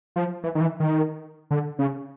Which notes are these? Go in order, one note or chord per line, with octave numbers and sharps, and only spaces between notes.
F3
E3
D#3
E3
D#3
D3
C#3